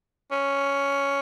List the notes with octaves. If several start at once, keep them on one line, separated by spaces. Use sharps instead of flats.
C#4